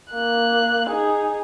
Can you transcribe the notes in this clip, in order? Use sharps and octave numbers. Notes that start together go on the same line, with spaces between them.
A#3 F#6
D#4 G#4